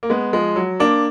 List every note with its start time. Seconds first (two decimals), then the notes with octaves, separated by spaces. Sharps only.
0.03 A#3
0.10 G#3 B3
0.33 F3 G#3
0.56 F#3
0.80 A#3 D4